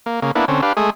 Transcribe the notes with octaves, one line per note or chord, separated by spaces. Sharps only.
A#3
C#3 A#3
A#3 B3 D4 E4
D3 C4 C#4
D4 G4 B4 F5
G#3 A3 G#4